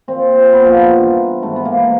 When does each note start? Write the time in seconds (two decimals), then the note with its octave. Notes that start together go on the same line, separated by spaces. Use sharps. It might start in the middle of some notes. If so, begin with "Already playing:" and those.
0.08 A#2 F3 C4
0.53 A#2 F3 B3
0.65 A#3
0.78 B3
0.98 G2 E3
1.43 G#2 E3 A3
1.56 B3
1.65 A#3
1.77 B3